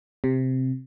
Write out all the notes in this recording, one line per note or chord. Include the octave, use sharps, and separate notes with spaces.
C3